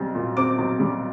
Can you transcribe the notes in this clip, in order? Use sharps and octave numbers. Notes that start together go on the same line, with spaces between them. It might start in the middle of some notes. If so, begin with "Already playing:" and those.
Already playing: B1 G3 C4
A#2
C4 D6
B1
G3